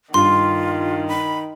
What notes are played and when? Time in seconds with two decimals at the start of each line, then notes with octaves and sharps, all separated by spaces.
0.14 G2 D#3 F4 C6
1.08 B5